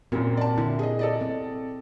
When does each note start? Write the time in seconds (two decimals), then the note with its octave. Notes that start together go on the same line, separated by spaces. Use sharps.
0.12 F#2 A#2 F#3 C4
0.37 D5 A5
0.58 D3 E4
0.79 G#4 D#5
0.99 A4 D5 D#5
1.21 C4